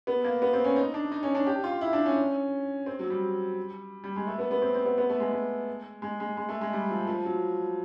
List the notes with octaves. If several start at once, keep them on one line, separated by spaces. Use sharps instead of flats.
B3
A#3
B3
C4
C#4
D#4
D4
D#4
C#4
D4
G4
F4
E4
D4
C#4
C4
F#3
G3
G3
G#3
A3
B3
B3
C4
C4
B3
B3
A3
G#3
G#3
G#3
G#3
G#3
A3
G#3
G3
F3
F3
F#3